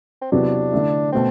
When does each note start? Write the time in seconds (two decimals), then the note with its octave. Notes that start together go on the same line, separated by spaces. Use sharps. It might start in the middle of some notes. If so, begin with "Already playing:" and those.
0.22 C4
0.32 E2 C3 F#3 B3 D4
0.72 D3 A3 E4
1.12 B2 A3 C4